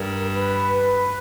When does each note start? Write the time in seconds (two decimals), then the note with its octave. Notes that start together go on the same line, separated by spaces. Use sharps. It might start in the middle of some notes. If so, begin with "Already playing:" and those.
Already playing: G2 A#4
0.32 B4